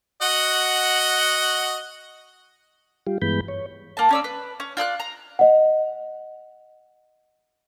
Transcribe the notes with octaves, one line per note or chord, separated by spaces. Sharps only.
F#4 D#5 F#5
G3 F4 G4
G2 E3 G#3 B3 B5 G6
C#5
A#3 A5
C#4 D5 E6
B4
C#4
F4 D5 E6 F#6
A#5
D#5 F#5